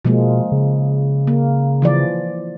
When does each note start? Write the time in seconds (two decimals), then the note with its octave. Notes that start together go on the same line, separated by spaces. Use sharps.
0.05 B2 F3 G#3 A#3
0.52 C#3
1.27 A#3
1.82 E3 F3 D5